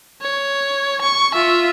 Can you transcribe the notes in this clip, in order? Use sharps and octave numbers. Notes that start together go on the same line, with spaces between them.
C#5
C#6
F4 E5